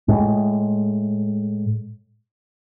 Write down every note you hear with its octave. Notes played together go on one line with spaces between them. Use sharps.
A2 G#3